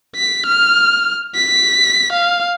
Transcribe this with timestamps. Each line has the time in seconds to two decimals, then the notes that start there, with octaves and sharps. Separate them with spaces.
0.16 B6
0.46 F6
1.35 B6
2.13 F5